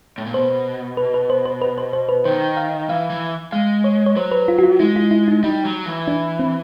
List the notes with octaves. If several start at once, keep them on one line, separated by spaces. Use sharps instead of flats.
A2
A#2
B2 C5
B4
B4
C5
C5
B4
C5
C5
B4
D#3 C5
F5
E3 F5
E3
G#3 F5
C#5
C#5
F#3 C5
B4
F4
F#4
F4
G#3 E4
F4
E4
D#4
G3 D#4
F#3
E3
D4
C4